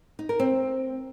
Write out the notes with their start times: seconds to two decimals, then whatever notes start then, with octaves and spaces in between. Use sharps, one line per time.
0.19 D#4
0.29 A#4
0.40 C4